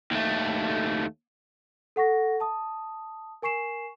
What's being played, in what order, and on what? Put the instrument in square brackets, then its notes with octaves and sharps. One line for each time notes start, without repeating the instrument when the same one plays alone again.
[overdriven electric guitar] D#2 A3
[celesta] A4 F#5 C#6 A#6
A5 D#6
A#4 G#5 C#6 C7 E7